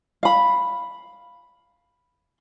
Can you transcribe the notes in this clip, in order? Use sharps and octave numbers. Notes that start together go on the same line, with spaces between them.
F5 B5